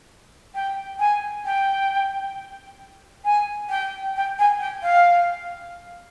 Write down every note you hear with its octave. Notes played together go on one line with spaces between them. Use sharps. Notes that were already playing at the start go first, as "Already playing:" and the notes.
G5
G#5
G5
G#5
G5
G5
G#5
G5
F5